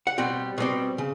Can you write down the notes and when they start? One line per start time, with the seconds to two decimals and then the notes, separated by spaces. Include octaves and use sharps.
0.07 F#5
0.18 B2 G3 C4 G5
0.58 B2 G3 C4
0.98 C#3